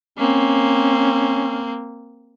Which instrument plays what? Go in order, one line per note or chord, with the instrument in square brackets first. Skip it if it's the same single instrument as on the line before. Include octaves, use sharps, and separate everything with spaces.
[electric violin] A#3 C4 [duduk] C#4